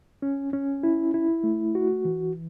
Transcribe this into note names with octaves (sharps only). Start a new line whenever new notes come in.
C#4
C#4
E4
E4
A3
F#4
E3